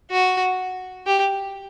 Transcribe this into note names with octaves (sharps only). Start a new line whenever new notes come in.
F#4
G4